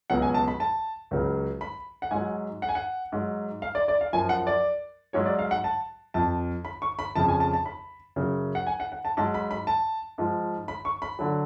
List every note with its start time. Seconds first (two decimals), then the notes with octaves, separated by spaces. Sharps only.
0.10 C#2 B2 F#3 F#5
0.22 G#5
0.34 A5
0.48 B5
0.60 A5
1.11 C#2 C#3 F#3
1.61 B5
2.02 F#5
2.11 G#2 F#3 G#5
2.62 F#5
2.69 G#5
2.75 F#5
3.12 G#2 F#3
3.62 F5
3.75 D5
3.88 D5
4.01 F5
4.13 F#2 F3 G#5
4.29 F#5
4.47 D5
5.13 G#2 F#3 C#5
5.26 D5
5.39 F5
5.51 F#5
5.64 A5
6.14 F2 F3 A5
6.65 B5
6.82 C#6
6.99 B5
7.15 F2 C#3 F3 A5
7.28 G#5
7.40 A5
7.53 A5
7.66 B5
8.16 F#2 C#3 F#3
8.55 F#5
8.67 G#5
8.80 F#5
8.92 F#5
9.05 A5
9.17 G#2 F#3 A5
9.34 B5
9.51 B5
9.67 A5
10.18 G#2 F3
10.68 B5
10.85 C#6
11.02 B5
11.19 D3 F#3